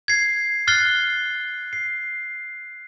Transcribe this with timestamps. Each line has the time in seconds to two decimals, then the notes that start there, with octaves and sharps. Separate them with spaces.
0.08 G#6 C7
0.68 F6 F#6 A6 C7 G7
1.73 C7